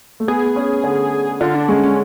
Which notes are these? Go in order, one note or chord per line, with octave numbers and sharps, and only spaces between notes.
A3
B3 G#4
C#4
D3
D3 F4
D4
G#3 C#4
C#4